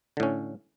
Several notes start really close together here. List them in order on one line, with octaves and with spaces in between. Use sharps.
D3 A2 C#4